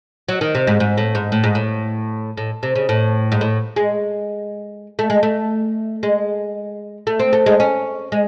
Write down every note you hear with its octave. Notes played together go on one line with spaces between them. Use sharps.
F#3
D#3
C3
G#2
G#2
A2
G#2
A2
G#2
A2
A2
C3
C#3
A2
G#2
A2
G#3
A3
G#3
A3
G#3
A3
C4
A3
G#3
C#4
G#3